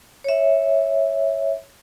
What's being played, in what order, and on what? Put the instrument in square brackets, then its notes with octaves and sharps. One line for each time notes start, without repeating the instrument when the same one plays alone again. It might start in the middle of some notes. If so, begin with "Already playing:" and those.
[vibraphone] C#5 E5